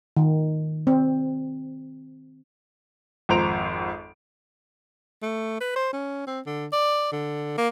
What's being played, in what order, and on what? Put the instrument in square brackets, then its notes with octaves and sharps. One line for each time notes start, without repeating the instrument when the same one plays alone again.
[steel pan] D#3
C4
[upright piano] G#1 F2 C5 A#5 D7 F7
[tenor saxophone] A3
B4
C5
C#4
C4
D3
D5
D3
A#3